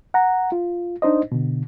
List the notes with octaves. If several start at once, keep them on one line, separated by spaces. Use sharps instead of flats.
F#5 A#5
F4
D4 D#4 C5 D#5
B2 D3